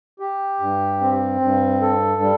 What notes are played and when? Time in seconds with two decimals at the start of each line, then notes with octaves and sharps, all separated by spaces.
0.20 G4
0.60 G2
1.01 C4
1.41 G2
1.82 A4
2.22 G3